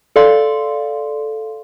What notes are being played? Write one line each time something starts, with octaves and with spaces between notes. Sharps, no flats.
A4 D5 F5 C6